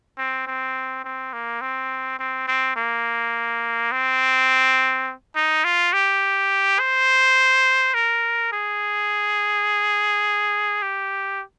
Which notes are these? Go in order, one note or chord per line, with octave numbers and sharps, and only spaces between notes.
C4
C4
C4
A#3
C4
C4
C4
A#3
C4
D#4
F4
G4
C5
A#4
G#4
G4